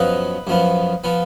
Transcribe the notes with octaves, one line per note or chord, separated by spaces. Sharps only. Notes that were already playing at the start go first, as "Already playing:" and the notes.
Already playing: F#2 F3 B3 B4 D#5
F#2 F3 B3
F3 B3